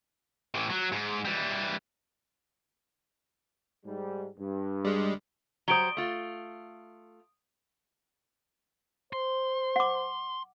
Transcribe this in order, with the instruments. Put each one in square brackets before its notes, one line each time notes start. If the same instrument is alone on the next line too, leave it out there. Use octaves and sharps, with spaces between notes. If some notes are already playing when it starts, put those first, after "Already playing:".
[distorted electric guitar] A2 E3
F#3
G#2
E3 G3
[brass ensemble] G#2 G3
G2
[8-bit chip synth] G3 G#3
[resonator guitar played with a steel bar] F#3 G3 C5 [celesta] D#6 D7 G7
[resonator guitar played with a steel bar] A3 F4
[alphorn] C5 [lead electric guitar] C6
[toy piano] F#5 D6